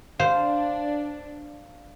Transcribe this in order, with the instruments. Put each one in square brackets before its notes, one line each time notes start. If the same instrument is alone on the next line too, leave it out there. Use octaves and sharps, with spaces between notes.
[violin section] D4 [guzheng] C5 [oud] F5